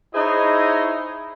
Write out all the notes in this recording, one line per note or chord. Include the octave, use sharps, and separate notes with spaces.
D#4 E4 G#4 C5 C#5 D#5